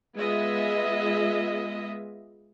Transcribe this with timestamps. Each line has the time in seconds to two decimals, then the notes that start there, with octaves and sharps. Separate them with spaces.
0.17 G#3 B3 F4 G#4 D#5 E5